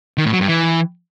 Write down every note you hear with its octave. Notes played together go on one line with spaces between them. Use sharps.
D#3
A2
F#3
G2
E3